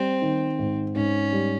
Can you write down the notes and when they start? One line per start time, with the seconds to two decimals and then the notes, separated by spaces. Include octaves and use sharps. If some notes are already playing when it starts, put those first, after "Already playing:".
Already playing: G3 C4
0.22 D#3
0.59 G#2
0.95 G#2 C#4
1.33 G3